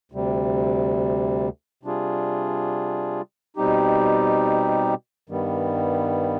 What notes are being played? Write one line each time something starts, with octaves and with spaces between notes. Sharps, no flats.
D2 C3 G3
C3 G3 D4 F4 G#4
B2 G3 C4 D#4 G4
G2 D#3 G3 B3